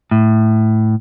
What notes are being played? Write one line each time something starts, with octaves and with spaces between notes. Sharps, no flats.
A2